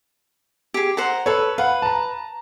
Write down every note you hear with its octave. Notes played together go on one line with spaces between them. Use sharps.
G4 G#4
C5 F#5 A#5
A4 B4 C#5
B4 F5 F#5
A5 A#5